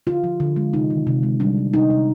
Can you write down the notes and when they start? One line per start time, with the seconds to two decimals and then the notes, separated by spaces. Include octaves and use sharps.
0.07 D3 F4
0.24 F3
0.40 D3
0.56 G#3
0.73 C3 D#4
0.90 D#3
1.07 C3
1.23 G#3
1.40 G3 D4
1.57 G3
1.74 C3 D#4
1.90 C3